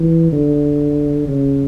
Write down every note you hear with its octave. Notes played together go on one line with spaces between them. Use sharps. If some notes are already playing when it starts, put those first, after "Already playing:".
Already playing: E3
D3
C#3